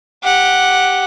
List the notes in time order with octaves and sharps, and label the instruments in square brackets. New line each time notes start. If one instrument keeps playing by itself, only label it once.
[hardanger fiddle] G4 F#5